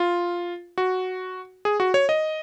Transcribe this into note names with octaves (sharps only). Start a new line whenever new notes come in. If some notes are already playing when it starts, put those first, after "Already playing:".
Already playing: F4
F#4
G#4
F#4
C#5
D#5